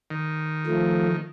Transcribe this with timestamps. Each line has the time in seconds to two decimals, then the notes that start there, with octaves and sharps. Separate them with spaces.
0.10 D#3
0.67 F3 A3